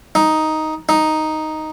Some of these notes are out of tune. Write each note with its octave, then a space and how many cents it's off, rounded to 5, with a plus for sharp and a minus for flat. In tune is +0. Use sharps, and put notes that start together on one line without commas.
D#4 +5
D#4 +0